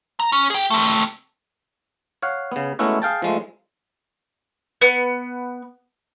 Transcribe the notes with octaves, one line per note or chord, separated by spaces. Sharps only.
A#5
C#4
G#4 G5
A3 C4
C#5 F5 F#5
C#3 B3
G#3 A3 B3 C#4 E4 F#4
G#4 F5 G5 A5
F3 G#3 A3
B3